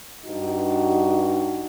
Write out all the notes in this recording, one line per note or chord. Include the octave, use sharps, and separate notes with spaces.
G2 D#4 F#4